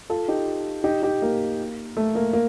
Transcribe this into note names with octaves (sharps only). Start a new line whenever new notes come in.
F4 A4
D#4 G4
D#4 G4
D#4 G4
A#3
A3
A#3
A#3